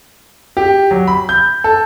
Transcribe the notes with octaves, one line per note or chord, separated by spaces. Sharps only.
G4
F#3
B5
G6
A4